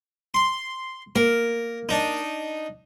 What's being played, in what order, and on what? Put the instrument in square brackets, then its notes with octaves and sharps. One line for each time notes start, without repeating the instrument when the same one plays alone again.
[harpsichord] C6
[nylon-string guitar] A#3 [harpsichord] A#4
[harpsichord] D4 D#4